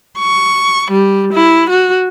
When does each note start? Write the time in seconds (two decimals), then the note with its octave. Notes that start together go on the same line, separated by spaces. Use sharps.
0.19 C#6
0.91 G3
1.33 E4
1.70 F#4